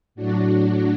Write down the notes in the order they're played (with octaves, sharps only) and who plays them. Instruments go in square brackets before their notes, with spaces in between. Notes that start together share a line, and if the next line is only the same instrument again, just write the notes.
[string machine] A2 F#3 D4 F#4